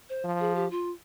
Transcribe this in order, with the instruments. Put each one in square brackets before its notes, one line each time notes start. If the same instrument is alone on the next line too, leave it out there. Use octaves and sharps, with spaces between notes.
[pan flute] C5
[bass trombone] F3
[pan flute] G#4
G4
F4